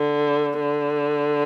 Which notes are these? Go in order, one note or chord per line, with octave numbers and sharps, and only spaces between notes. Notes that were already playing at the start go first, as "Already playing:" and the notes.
Already playing: D3
D3